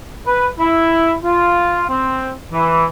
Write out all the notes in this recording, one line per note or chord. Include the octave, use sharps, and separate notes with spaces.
B4
E4
F4
C4
E3